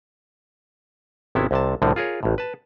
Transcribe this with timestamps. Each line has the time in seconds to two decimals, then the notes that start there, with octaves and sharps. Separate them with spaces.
1.35 G#1 C3 B3 C#4 E4
1.51 C2 C3 A5
1.82 C2 A2 D3 F3
1.96 F4 G#4 A#4 C#5
2.23 A1 A2
2.38 B4 A5